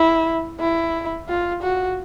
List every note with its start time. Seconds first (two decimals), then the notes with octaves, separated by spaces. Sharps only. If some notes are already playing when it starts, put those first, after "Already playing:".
Already playing: E4
0.60 E4
1.29 F4
1.63 F#4